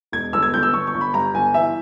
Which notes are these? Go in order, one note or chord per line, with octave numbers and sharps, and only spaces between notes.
E1 G#6
G1 E6
G#6
G1 G6
E6
G1 C#6
C#6
G1
B5
G2 A#5
G1 G#5
E3 E5